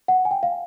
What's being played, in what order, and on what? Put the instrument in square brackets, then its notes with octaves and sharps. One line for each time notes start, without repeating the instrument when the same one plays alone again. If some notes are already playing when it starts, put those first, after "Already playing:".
[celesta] F#5
G#5
G5
F5